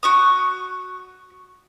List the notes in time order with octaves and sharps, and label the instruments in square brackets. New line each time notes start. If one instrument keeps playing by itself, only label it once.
[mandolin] F#4 C#6 D#6